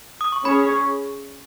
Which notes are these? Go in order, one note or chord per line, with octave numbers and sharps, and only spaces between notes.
D#6
C#6
C#4 G#4 C#5 B5